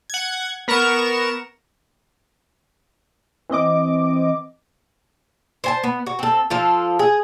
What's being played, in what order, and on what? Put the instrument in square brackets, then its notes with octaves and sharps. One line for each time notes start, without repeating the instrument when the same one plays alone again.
[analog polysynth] F#5 G#6
B3 A#4 A#5 C#6 E7
[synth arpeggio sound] E3 C4 D#5 D6
[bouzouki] C5 G#5 A5
B3
F#4
C4 A4
F3 F4 A4
G#4